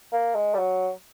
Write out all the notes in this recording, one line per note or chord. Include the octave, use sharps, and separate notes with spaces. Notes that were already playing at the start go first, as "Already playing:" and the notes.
A#3
G#3
G3
F#3